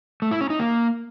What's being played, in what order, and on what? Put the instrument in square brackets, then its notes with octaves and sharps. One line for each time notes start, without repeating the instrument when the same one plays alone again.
[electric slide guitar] A3
E4
C#4
D#4
A#3